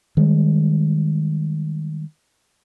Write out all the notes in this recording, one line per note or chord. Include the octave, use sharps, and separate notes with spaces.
D#3 G3 G#3